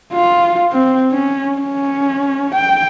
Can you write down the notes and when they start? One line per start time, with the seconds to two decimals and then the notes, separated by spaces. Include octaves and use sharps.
0.13 F4
0.72 C4
1.12 C#4
1.58 C#4
2.55 G5